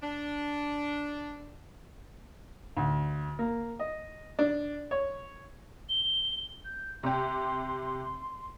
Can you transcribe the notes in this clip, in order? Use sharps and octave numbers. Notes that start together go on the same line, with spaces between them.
D4
D2
A#3
D#5
D4
C#5
G7
G6
C3 G4 C6